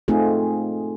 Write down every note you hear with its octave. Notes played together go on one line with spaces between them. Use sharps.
A3 C4 D#4 F4 G#4